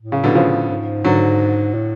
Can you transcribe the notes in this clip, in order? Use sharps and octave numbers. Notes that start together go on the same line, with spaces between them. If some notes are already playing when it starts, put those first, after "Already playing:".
A2
C#3
B2 D3
C#3 F3
G#2
G#2 D3 F#3
A2